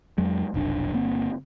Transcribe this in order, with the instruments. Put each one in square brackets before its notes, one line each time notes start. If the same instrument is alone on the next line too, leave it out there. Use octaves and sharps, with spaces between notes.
[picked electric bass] F2 F#3 G#3
F1 B1 D4
G1 A#3 C4